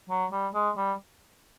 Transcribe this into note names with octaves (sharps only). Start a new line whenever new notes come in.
F#3
G3
G#3
G3